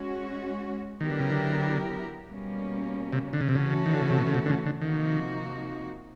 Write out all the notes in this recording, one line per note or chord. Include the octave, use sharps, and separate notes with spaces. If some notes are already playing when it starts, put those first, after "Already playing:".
Already playing: G#3 C#4 F#4
D#3 F#3 B3 E4 G4 A#4
D3
C#3
D3
B2 G3 A#3 C#4
C3
D3
C#3
C3
C#3 E3 A3 C#4 F#4 A4
D#3
D3
C#3
C3
B2
C#3
C3
D3
C#3
D3
C3 D#3 F3 A#3 D#4 F#4